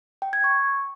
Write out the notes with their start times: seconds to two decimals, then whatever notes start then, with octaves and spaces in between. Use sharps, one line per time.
0.22 G5
0.33 G#6
0.44 C#6